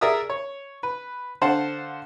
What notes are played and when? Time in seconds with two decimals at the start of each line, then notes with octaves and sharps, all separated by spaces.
0.01 G#4 A#4 D5 E5 D#6 E6
0.30 C#5
0.83 B4
1.41 D3 C5 F5 F#5 A5